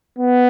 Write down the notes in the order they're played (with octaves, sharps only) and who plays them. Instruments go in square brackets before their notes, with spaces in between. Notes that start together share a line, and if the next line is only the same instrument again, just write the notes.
[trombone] B3